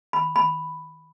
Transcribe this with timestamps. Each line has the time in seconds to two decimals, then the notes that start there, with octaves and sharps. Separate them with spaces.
0.13 B5
0.36 B5